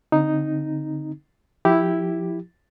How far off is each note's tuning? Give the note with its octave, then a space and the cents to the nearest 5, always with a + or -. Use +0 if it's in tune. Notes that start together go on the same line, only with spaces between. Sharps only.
D3 -25 C4 +0 D#4 +0
F3 +10 E4 +0 G4 +0